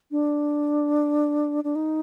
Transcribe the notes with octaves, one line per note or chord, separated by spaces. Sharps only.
D4
D4
D#4